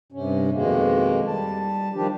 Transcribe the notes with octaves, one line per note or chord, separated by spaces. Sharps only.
G2 C3 C#4
F2 B2 D#3 G#3 A#3
G3 A5
D#3 F3 G3 D4 G4